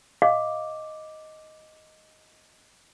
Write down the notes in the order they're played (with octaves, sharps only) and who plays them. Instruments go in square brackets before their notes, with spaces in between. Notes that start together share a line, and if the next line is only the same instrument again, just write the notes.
[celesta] D#5 D6 [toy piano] F5